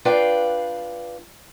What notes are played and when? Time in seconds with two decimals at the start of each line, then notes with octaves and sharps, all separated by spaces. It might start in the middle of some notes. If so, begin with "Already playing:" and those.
0.05 D4 F4 B4 D5 F5 G5